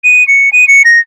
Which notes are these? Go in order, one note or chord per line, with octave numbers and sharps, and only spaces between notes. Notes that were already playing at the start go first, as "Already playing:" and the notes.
D#7
C#7
D#7
C#7
A#6